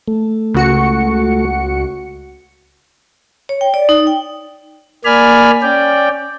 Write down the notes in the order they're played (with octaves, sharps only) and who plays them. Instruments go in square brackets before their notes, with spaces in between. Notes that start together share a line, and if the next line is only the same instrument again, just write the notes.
[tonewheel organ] A3
[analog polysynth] C#2 F#4 C#7
[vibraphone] C#5
G5
D5
D#4
G5
[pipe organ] A#3 D5 G#5 B5 F6
C#4 D5 G5